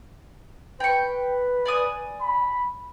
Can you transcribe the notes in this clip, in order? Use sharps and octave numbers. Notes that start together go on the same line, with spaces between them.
B4 G5 C#6
D5 G#5 D#6
B5